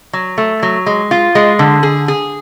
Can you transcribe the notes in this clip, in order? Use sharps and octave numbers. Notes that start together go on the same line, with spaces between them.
F#3
A3
F#3
G#3
F4
G#3
D3
G#4
G#4